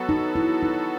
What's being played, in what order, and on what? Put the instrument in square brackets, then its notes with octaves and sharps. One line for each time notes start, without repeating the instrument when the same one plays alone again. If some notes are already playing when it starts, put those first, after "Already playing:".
Already playing: [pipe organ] F#3 B3 F#4 A4
[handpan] D#4
E4
D#4